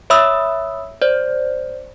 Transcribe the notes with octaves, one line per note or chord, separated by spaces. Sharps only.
C#5 E5 B5 D#6 E6
C5 D5